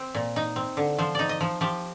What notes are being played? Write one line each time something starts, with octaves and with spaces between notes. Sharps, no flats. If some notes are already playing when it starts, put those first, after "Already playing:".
Already playing: C4
A#2
D#4
C4
D3
F3 C5
D#4 D5
D#5
F3
F3 G4